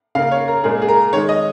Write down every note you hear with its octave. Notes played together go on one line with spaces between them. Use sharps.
C#3 A#3 F5
C#5
A#4
A#2 G#3 G#4
G#4
A#4
D#3 G#3 C#5
D#5